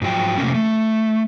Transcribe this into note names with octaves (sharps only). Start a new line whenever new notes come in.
G#2 F3 F#3 G5
C3 A3 A#3 C#4
A3